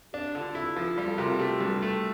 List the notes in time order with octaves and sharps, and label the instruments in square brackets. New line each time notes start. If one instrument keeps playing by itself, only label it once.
[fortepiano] D4 [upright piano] G4
[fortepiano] D3 [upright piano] F4 A4
[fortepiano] E4 [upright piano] F4 A4
[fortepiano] F3 [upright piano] G4
[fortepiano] G3 [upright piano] F4
[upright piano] F4 A4
[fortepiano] C3 [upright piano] G4 A#4
[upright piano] F4 A4
[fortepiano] A3 [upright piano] G4
[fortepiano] G2 [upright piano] G4
[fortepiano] A3